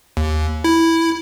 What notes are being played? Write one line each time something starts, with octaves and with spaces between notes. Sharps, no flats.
D#2
E4